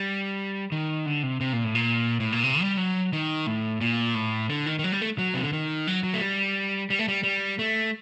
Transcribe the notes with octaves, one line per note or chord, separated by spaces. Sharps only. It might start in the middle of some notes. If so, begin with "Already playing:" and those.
Already playing: G3
D#3
D3
C3
C3
A#2
A2
A#2
A2
A#2
C3
G3
F#3
D#3
A2
A#2
A2
D3
D#3
D#3
F#3
G3
A3
F#3
C3
D3
D#3
F#3
F#3
A3
G3
G3
A3
G3
G3
A3